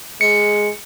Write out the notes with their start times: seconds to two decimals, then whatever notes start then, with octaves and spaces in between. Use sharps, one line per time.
0.21 G#3 C#7